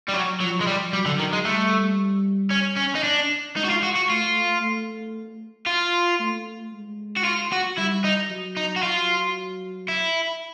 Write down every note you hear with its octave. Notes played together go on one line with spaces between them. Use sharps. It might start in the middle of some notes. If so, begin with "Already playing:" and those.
G3
F#3
F3 F#3
G#3
G3
F#3 G3
D3
D#3
G#3
G3 A3
C#4
C#4
D#4
D4
G#3 D#4
F#4
F4
F#4
F#4
A3 F4
A3
F4
A3
G#3
F#4
F4
F#4
G3 E4
D#4
F#3
D#4
F#4
F#3 F4
E4